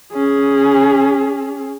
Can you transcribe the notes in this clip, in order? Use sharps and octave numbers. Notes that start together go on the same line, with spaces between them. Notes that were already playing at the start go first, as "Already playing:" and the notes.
C#4 G#4